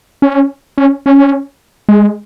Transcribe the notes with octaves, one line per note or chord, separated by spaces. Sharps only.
C#4
C#4
C#4
G#3